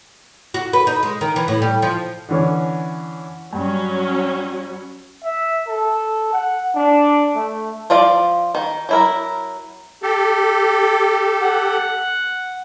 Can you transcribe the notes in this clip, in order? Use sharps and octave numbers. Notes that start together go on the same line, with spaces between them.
F#4
B4
D#4
G#3
D#3
E3
A2
G3
F3
D3 E3 C#4
G2 F#3 C#4
E5
A4
F#5
D4
A3
F3 F4 D5 F5
D#3
F#3 E4 A#4
G4 A4
F#5